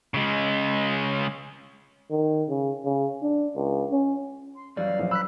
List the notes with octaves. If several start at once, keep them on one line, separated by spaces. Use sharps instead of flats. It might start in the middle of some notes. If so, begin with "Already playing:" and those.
C#3 G#3
D#3
C#3
C#3
D4
C#2
C#4
C6
F#2 E3 G3 D5 D#5 F5
A#1
B5 E6 F#6 B6